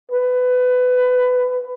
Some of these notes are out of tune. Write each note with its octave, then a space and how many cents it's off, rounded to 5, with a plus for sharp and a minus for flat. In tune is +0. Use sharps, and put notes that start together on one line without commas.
B4 +20